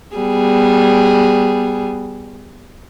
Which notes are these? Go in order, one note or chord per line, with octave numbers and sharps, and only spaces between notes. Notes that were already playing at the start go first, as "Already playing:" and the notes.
G3 B3 G#4